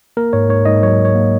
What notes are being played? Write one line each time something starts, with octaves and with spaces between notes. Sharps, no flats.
A#3 A#4
G#2 C#5
G#2 C#5
G#2 D#5
F#3 C#5
G#2
C#5
A#3